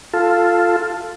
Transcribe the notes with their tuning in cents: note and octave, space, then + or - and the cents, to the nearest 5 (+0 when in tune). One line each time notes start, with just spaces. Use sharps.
F4 +0 A4 +5